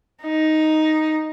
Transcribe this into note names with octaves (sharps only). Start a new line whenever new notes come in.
D#4